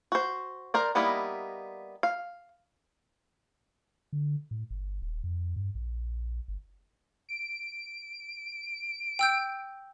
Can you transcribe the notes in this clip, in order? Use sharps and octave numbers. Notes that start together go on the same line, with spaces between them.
F#4 C5
A#4 C5 D5
G3 A#3 B3 D#4 E4
F5
D3
A2
G1
D#1
F2
G2
A#1
G1
D7
G5 E6 G6